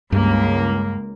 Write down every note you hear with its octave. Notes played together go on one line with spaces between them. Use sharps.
C#2 G2 A#3